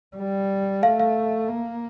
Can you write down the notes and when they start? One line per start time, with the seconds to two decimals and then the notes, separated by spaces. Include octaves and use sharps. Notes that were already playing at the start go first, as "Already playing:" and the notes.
0.17 G3
0.82 A3 F5
1.00 F5
1.49 A#3